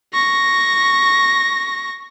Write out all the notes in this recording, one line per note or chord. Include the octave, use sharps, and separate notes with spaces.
C#6 A#6